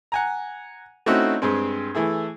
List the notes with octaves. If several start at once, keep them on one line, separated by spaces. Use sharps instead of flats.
F#5 G#5 A#5
A3 C4 C#4 D#4 E4 F#4
G2 G#3 C4
E3 A3 E4 G#4